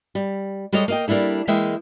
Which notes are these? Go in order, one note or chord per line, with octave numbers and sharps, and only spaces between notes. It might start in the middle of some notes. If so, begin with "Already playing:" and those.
G3
G3 G#3 A4 C#5 D#5
A#3 D#5 G5
G3 A#3 D4 E4 A4
E3 G#3 A#3 E5 G5